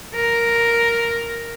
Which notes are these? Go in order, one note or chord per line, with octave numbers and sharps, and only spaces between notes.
A#4